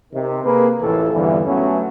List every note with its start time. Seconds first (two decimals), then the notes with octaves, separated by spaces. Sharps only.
0.13 C3 D#3
0.45 A#3 G#4 B4
0.82 A1 F2 A2 E3 A4
1.13 E2 G2 D3 E3
1.46 F#3 A3 B3 C#4